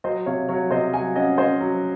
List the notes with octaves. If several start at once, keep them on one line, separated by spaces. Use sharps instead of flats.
F#3 C5 D#5
C3 C#5 F5
F#3 C#5 F5
C3 C5 D#5
F#3 F5 G#5
C#4 D#5 F#5
C#4 C5 D#5
F#3